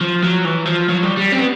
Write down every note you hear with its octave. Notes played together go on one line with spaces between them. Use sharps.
F3
F#3
E3
F3
F#3
G3
G3
C4
B3